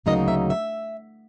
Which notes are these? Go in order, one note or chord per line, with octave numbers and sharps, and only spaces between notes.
D2 C#3 F#3 A#3 D#4 D#5
E5
E5